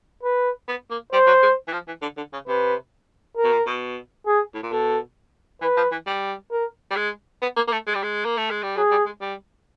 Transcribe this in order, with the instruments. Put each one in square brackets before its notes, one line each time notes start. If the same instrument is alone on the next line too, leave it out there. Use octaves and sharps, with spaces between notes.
[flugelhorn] B4
[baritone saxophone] B3
A#3
[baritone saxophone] G3 [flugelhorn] C5
[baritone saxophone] F#3
G#3
E3
F3
E3
D3
D3
C#3
[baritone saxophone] C3 [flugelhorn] B4
[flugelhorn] A#4
[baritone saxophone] B2
A#2
B2
[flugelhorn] G#4
[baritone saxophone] A2
A#2
[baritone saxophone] B2 [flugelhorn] A4
[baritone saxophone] E3 [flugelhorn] B4
[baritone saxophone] F3
E3
G3
[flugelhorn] A#4
[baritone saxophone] G3
G#3
B3
A#3
A#3
A3
G#3
G3
G#3
A#3
A3
G#3
G3
[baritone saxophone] F#3 [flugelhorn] G#4
[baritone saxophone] G3
G#3
G3